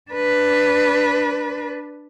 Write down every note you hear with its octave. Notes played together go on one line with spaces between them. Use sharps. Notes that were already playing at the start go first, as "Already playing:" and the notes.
D4 B4